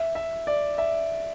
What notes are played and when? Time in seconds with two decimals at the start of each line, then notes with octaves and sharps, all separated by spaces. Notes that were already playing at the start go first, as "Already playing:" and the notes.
Already playing: E5
0.15 E5
0.47 D5
0.78 E5